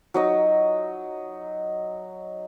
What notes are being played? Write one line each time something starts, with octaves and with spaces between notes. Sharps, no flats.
F#3 D#4 D#5